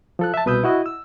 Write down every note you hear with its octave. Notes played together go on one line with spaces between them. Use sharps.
F3 A4 F#6
E5 A5
C2 B2 B4 D#6 E6 G6
E4 F#4 D#5
E6